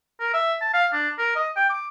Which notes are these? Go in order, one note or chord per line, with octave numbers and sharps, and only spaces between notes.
A#4
E5
A5
F5
D4
A#4
D#5
G5
D6